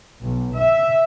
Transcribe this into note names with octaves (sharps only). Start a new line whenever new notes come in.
B1
E5